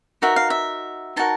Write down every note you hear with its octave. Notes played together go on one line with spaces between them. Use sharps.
D#4 F#4 A#4 E5
F5
E5
D#4 F#4 A#4 A5